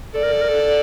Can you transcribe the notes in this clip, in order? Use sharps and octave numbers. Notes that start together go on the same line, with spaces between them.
A4 D5
A#4
A4
A#4
A4